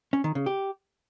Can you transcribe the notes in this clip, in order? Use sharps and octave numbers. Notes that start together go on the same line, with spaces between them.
C#4
D#3
C#3
G4